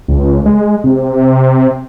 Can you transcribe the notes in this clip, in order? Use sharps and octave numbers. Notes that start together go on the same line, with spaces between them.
C#2
G#3
C3